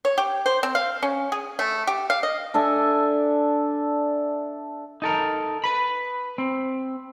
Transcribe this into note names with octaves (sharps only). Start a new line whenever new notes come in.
C#5
G4
C5
C4
F5
C#4
G#4
A3
G4
F5
D#5
D4 A4 E5 G#5
D#4 A4 A#4
B4 B5
C4